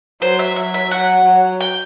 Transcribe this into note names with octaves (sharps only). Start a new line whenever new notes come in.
F#3 C5
E5
F#3 E5
E5
F#3 F#5
F#3
G5